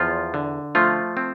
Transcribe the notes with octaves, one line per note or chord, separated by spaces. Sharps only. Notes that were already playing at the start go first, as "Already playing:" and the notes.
Already playing: E2 F3 F4
D3
F3 A3 F4
C4